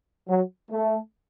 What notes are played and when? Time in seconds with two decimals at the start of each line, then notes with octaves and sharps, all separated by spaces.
0.28 F#3
0.71 A3